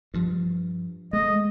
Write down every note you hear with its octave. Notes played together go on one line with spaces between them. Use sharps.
G2 F3
G#3 A3 D#5